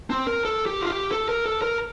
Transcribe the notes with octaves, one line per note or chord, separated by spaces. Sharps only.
C4
A#4
A4
G4
F4
G4
A4
A#4
A4
A#4